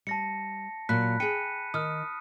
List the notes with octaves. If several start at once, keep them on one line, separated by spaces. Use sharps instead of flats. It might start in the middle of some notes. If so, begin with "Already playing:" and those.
G3 A5 A#6 C#7
A#2 F#3 B5 F#6 B6
G#4 G5 C#7 D#7
D#3 D#6 F6